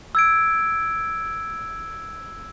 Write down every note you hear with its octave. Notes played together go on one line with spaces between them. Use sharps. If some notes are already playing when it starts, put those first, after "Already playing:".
E6 G#6 D7